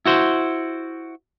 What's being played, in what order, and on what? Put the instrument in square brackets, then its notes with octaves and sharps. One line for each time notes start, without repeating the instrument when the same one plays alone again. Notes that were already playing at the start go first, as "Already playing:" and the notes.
[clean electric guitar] E4 F#4 C5